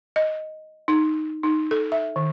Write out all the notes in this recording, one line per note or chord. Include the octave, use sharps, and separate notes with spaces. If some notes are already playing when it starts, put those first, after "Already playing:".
D#5
D#4
D#4
A4
E5
D#3